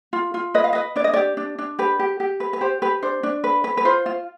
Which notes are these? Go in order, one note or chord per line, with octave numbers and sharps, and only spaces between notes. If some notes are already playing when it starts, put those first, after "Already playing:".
F4
F4
B4 D#5
F5
B4 D#5
D4 D5
D#5
G4 D5
D4
D4
G4 B4
G4
G4
B4
B4
G4 C5
G4 B4
D4 C5
D4
B4
B4
B4
F4 C5
F4